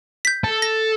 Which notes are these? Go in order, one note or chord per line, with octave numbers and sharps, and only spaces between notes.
G6 B6
A4
A#6